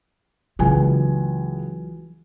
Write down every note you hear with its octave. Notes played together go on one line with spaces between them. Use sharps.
C#2 E3 F#3 G#5